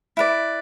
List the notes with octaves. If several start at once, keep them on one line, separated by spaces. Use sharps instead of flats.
E4 B4 D5